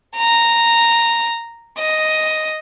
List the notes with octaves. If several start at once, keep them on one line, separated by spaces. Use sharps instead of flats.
A#5
D#5